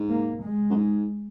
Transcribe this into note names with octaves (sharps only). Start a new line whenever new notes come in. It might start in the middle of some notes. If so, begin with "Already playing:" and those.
Already playing: G#2
A#3
G#3
F#2
G#2